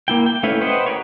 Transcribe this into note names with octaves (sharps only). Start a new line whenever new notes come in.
A#3 E4 G5
G5
A3 C#4 E4 B4 F5
B4 C5 D#5 F#5 G5
G4 A#4 B4 C#5